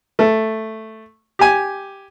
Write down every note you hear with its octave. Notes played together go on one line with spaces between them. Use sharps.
A3
G4 G#5